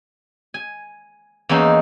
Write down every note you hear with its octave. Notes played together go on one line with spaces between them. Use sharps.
G#5
E2 A#3 C#4 D#4 E5